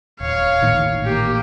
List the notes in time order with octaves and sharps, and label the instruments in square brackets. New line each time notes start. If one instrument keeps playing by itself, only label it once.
[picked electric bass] D#1 [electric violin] C#5 F5
[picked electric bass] A1 A#2 D#3
[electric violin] A#3 G4